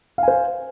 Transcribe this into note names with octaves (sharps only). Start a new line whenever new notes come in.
C5 F5 G#5